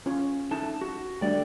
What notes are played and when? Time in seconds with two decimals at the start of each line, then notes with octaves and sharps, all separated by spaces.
0.06 C#4 F4 C#5
0.51 A3 D#4 A5
0.81 F#4
1.21 D3 G3 A3 D5 G5